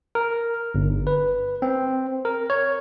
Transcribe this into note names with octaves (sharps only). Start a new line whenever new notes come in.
A#4
G1
B4
C4
A#4
C#5